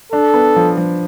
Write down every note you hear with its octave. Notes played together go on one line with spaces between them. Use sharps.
D4 A4
B3
F3
F3